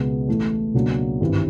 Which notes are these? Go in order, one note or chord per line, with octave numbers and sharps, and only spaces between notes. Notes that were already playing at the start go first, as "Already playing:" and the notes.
Already playing: C#2 B2 G#3 B3
A1 A2 E3 A3
C#2 B2 F#3 A#3 D4
G#1 G2 E3